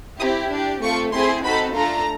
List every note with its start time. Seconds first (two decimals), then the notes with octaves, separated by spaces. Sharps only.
0.20 C4 E4 G4 D#6
0.52 D4 G4
0.82 A3 C4 F4 A4 C#6
1.13 C4 E4 G#4 C6
1.44 C4 D#4 F#4 A4 B5
1.75 A3 D4 F4 A4 A#5